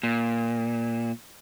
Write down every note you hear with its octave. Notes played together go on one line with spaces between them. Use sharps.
A#2